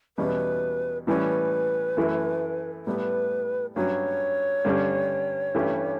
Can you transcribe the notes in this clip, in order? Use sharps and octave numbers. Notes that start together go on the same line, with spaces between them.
E2 B2 G3 C#4 B4
A2 E3 G3 C#4 B4
F#2 E3 A3 E4
A2 G3 B3 B4
G2 F#3 C#4 C#5
G2 D3 G3 C#4
G2 E3 A3 C#4 G4